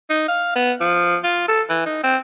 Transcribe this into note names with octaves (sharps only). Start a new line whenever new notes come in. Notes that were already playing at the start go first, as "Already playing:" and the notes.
D#4
F5
B3
F3
F4
A4
E3
D#4
C4